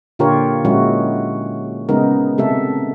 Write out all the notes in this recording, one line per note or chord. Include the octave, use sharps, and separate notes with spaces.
A#2 D3 F4 G4 A#4 C#5
A#2 F#3 G#3 C#4 E4 F#4
C#3 G#3 B3 D#4 A#4
C3 A3 A4 E5